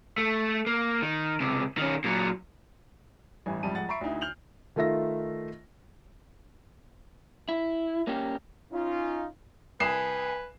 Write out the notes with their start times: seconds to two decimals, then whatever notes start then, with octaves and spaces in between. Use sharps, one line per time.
0.18 A3
0.67 A#3
1.02 D#3
1.40 C#2 C3
1.78 D#3 C#4
2.04 A#2 F#3
3.46 A1 G2 E3 G#5
3.63 F2 G#2 C3 G3 A5 D#7
3.75 F2 G#3 F#5 A6
3.89 E5 A#5 B5 C#6 C7 D7
4.01 D2 D3 D#4 E4
4.21 F6 G6 F7 F#7
4.76 D#3 A3 F4 E5 A#6
7.49 E4
8.07 A#3 C#4 G4
8.72 C#4 D#4 F4
9.80 C2 B4 G#5 D#6 C7 E7